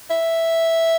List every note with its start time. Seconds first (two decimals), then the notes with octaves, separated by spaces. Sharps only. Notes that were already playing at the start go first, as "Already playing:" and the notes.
0.10 E5